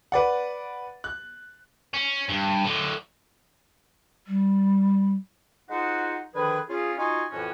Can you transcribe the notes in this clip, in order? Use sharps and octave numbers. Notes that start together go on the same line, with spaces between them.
B4 D5 F#5
F#6
C#4
G2
A2 D3
G3
G#3 D#4 F4 F#4 C5 F#5
D3 D#3 F3 G#4 B4
C#4 F4 G#4
D#4 F4 F#4 G#5
F2 A2 E3 C#4 F#4 G#5